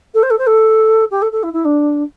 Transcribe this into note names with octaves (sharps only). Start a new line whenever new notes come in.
A4
C5
A4
C5
A4
G4
A4
A4
E4
E4
D4